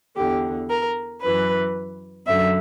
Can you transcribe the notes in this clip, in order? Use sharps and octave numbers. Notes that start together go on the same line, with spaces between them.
E2 D3 G4
A#4
F#2 E3 B4
F#2 D3 E5